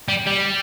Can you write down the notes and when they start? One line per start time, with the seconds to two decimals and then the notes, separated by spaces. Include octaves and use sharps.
0.08 G3
0.26 G3